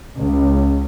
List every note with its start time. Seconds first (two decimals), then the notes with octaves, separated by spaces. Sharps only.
0.18 C#2